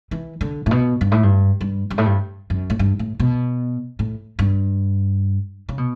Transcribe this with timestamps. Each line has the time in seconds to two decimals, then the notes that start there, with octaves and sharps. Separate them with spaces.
0.11 E3
0.41 D3
0.66 A2
0.71 B2
1.01 G2
1.11 A2
1.23 G2
1.61 G2
1.90 G2
1.98 A2
2.06 G2
2.50 F#2
2.70 A2
2.79 G2
2.99 A2
3.20 B2
3.99 A2
4.39 G2
5.69 C#3
5.78 B2